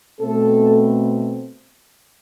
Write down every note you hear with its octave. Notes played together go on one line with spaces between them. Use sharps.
B2 A3 C4 A4